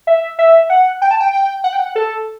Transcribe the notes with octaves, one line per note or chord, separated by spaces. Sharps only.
E5
E5
F#5
G5
A5
G5
G5
F#5
G5
F#5
A4